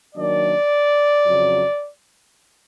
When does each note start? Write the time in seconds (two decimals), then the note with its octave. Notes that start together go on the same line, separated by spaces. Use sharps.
0.15 D#3 F#3 A#3 D4 D5
1.26 F2 C#3 F#3